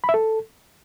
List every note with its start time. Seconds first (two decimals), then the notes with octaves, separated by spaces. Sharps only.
0.04 B5
0.09 E5
0.14 A4